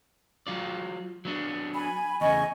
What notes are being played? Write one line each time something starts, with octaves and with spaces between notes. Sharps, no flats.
F#3 F4 D5
F#3 B3 D4
G#5 B5
E2 C#3 D#5 G#5 C#6